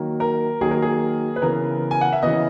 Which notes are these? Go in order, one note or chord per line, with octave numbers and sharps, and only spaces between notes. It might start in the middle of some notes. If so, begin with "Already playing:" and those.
Already playing: D#3 F#3 A#3
A#4
D#3 F#3 A#3 G#4
A#4
G#4
B4
C#3 E3 B3 A#4
G#5
F#5
E5
C#3 E3 B3 D#5